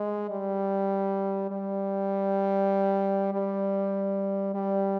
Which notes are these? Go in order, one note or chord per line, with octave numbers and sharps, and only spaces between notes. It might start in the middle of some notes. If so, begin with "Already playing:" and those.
Already playing: G#3
G3
G3
G3
G3